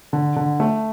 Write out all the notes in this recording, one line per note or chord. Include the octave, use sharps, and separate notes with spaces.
D3
D3
A3